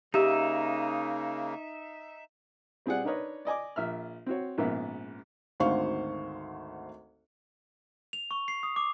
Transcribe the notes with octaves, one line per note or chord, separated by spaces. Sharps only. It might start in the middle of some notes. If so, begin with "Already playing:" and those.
C#3 A#3 D#4 G4 E5
G3 C4 F4 G#4 D5 F#5
D4 D#4 A#4 B4 C#5 D#5
D5 D#5 G#5 D6
A#1 E5 F6
C4 F#4 C#5
A#1 G#2 C#3 A#3 B3 E5
G#1 D2 C5 F5 C#6
F7
C#6
C7
D#6
D6